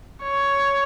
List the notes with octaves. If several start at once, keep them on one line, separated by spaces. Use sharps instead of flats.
C#5